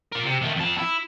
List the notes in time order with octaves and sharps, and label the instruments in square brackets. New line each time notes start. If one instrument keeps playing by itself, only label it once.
[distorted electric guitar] A#4 D5
C3
D#3 A3
F2 A5
E4